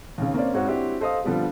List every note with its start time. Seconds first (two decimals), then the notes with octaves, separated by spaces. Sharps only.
0.18 D#2 C#3
0.34 A#3 C4 C#4 D5
0.53 G#2 C4 F#4 C#5
0.67 C4 D4 E4 F#4 G4
1.00 A4 C5 D#5 F5 D#6
1.24 D3 F3 G3 B3 G4